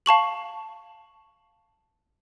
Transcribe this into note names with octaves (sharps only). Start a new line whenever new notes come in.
F5 A5 C#6 F#7